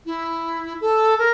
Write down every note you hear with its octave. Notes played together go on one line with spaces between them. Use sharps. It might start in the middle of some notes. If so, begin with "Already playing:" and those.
E4
A4
A#4